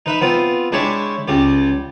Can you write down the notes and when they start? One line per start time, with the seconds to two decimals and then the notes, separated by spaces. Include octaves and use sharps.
0.06 D#4 B4 E5 B5
0.21 B3 C4 F4
0.72 G#3 D4 E4 G4 C#5 E5
1.28 C#2 G3 G4